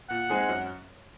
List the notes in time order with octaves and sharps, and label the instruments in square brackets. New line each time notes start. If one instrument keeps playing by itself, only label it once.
[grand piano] A#2 [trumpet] F#5
[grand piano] G#3 C4 D#4 G#4
F#2